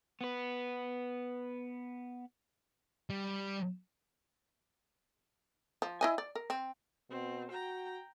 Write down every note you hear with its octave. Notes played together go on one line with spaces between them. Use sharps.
B3 B4
G3
F3
E4 D#5 G#5
D5
A#4
C4
B2 C4
F#4 G5 A#5